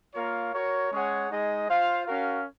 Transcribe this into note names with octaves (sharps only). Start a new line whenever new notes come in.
A#3 F4 A#4 C#5 F5
F#4 A#4 C#5
G#3 C#4 G#4 C#5 F#5
G#3 D#4 G#4 D#5
F4 C5 F5
C#4 F#4 A#4 F5